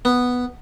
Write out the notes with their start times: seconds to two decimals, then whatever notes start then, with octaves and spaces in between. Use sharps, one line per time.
0.05 B3